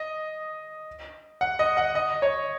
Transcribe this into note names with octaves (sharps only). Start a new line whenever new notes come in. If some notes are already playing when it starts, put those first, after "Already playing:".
Already playing: D#5
F#5
D#5
F#5
D#5
C#5